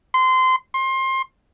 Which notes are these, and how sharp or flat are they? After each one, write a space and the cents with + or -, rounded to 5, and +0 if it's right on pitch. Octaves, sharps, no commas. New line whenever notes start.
C6 -20
C6 +25